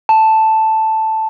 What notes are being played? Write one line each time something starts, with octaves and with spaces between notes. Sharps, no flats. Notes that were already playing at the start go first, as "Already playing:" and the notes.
A5